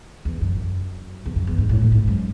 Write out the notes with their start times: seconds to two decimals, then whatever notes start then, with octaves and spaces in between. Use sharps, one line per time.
0.25 E2
0.41 F#2
1.25 E2
1.36 F#2
1.47 E2
1.58 G#2
1.69 A2
1.81 A2
1.92 G#2
2.08 F#2